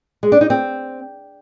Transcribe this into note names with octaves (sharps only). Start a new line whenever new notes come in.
G#3
D4
D#4
C4